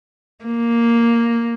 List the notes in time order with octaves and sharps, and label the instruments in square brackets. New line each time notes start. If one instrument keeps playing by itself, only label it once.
[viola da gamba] A#3